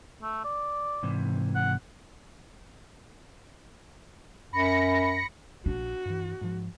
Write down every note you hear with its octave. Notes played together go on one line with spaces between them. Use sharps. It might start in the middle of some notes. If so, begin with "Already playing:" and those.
A3
D5
G#2 C3 E3
F#5
F#2 B5 A#6 C#7
A#1 D4 F#4
G2 E3
G#2 F3